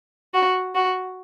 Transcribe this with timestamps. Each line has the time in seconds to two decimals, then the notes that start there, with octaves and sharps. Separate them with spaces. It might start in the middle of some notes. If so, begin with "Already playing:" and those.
0.34 F#4
0.75 F#4